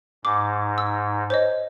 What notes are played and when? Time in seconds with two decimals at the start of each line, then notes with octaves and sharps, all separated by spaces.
0.25 G#2 D6
0.78 E6
1.30 C5 C#5 D#5